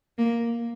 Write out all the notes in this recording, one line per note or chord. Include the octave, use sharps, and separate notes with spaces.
A#3